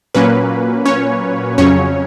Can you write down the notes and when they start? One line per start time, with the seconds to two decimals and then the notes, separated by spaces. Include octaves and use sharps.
0.14 A#2 F#3 A#3 C#4 B4
0.86 C#4 C#5
1.58 F2 C#3 F#3 C#4 C#5